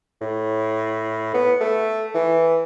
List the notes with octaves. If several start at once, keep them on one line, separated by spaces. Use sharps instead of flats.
A2
B3
A3
E3